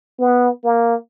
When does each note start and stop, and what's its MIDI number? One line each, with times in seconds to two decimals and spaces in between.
0.19 0.49 59
0.64 0.95 58